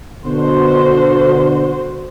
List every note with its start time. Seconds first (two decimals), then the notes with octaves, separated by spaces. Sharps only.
0.24 B2 D3 F#4 C5